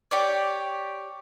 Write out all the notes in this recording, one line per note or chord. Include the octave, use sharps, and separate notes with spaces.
G4 C#5 D5